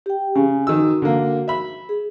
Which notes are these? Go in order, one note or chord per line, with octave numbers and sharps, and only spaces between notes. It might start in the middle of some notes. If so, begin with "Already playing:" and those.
G4 G5
C#3 G#5
D#3 F#4 E6
D3 A#3
E5 B5
G#4